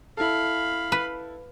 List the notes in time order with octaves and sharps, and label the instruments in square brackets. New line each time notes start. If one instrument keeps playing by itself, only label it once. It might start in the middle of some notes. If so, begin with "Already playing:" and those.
[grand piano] E4 A4 [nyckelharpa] F5 B5
[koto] B4